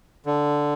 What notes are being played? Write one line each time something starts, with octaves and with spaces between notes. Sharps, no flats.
D3